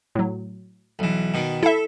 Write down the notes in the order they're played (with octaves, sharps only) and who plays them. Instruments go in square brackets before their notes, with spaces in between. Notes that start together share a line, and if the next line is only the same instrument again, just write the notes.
[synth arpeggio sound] A2 F#3
[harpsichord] B1 E3
B2 D#3
[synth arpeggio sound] E4 E5 [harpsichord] A4